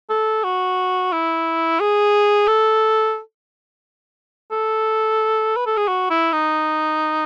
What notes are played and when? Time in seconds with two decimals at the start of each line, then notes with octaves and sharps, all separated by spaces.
0.10 A4
0.44 F#4
1.12 E4
1.80 G#4
2.47 A4
4.51 A4
5.56 B4
5.67 A4
5.77 G#4
5.88 F#4
6.10 E4
6.33 D#4